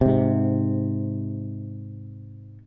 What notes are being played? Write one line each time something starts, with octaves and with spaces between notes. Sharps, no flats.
G#2 C3